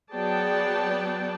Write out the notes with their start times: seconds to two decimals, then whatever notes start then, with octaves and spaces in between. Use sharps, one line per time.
0.14 F#3 B3 G#4 D5 G5 A5